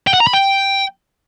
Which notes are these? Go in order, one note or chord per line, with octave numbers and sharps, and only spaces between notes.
G5
F#5
A#5
B5
G5